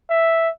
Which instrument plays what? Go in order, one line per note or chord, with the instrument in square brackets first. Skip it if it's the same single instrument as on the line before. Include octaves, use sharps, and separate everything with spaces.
[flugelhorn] E5